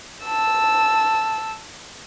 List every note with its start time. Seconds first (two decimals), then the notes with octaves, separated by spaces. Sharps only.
0.25 A5 E6